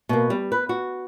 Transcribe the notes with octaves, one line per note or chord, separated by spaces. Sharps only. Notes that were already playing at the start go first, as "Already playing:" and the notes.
B2 A#3
G3
B4
F#4